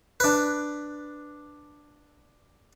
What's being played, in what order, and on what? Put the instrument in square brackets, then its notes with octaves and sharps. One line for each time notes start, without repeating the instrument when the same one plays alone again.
[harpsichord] D4 B4